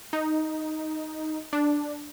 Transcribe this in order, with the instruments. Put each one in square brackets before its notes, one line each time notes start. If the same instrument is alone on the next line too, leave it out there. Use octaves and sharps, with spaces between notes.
[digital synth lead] D#4
D4